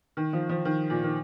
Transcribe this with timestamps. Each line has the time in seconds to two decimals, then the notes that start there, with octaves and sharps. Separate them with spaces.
0.17 D#3
0.33 F3
0.49 F3
0.65 D#3
0.90 A#2
1.04 D#3